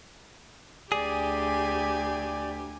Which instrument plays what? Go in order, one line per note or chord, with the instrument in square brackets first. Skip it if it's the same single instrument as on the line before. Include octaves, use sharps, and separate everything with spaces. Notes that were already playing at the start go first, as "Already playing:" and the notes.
[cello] D2 G4 [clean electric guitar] G#4 [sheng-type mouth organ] D5 [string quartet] G#5